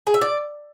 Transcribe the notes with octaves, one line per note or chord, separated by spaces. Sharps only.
G#4
E5
D5